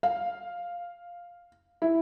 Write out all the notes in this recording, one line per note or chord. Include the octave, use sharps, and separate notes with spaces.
F5
E4